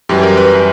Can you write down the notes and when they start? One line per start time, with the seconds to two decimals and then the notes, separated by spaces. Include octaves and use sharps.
0.09 F#2 E3 G3 G4
0.23 A#4
0.37 B4